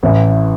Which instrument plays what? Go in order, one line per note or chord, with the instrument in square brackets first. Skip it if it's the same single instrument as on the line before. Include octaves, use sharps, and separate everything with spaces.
[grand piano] A1 A2 E3